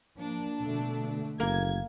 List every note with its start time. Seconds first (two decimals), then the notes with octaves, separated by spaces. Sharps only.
0.18 F3 A#3 D4
0.62 B2 D3 A3
1.40 F#1 A#3 G#6